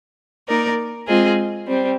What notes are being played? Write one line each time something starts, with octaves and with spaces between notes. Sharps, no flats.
A#3 D#4 A#4 D5
G#3 C4 F4 G#4 D#5
G3 C4